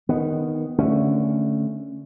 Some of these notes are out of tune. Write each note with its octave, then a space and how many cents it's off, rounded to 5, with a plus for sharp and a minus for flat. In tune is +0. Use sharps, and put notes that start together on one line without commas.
D#3 +0 B3 +0
D3 +0 A3 +0 C#4 +0